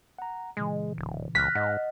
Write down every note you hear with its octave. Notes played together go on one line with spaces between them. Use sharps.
F#5 A#5
A#2 C#3 E3 G#3
D1
C#2 F6 F#6 A#6 B6
G#2 D#5 F#5